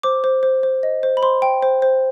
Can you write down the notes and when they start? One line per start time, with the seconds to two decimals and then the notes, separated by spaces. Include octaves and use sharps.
0.03 C5 D6
0.24 C5
0.43 C5
0.63 C5
0.83 D#5
1.03 C5
1.17 B5
1.22 C5 C6
1.42 G5
1.62 C5
1.82 C5